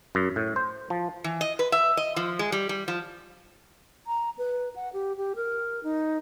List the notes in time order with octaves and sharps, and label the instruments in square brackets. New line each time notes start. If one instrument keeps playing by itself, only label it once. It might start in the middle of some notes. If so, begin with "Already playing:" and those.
[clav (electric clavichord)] F#2
A2
C5
F3
[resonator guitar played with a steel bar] E3
D#5
B4
E5
D#5
F3
G#3
G3
G3
F3
[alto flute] A#5
B4
F#5
G4
G4
A#4
D#4